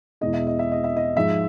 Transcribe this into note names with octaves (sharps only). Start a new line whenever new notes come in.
E2 B2 G#3 D#5
E5
D#5
E5
D#5
E5
D#5
G#2 F3 G#3 E5